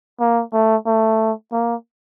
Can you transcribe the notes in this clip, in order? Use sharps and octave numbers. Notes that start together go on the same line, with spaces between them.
A#3
A3
A3
A#3